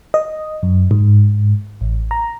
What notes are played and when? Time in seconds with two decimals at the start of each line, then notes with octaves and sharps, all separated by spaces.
0.14 D#5
0.63 F#2
0.91 G#2
1.81 A1
2.11 A#5